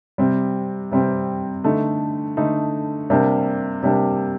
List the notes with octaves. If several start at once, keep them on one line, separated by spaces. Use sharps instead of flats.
C3 G3 C4
C3 G3 C4
D3 A3 D#4
D3 A3 D#4
C3 G3 A#3 D4
C3 G3 A#3 D4